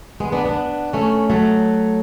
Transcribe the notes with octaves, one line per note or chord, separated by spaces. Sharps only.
G#3 B3
B3 D4
B3 D4
A3 C#4
F#3 A3